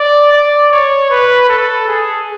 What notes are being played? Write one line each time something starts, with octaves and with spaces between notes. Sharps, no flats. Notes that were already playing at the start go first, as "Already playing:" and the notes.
Already playing: D5
D5
C#5
B4
A4
G#4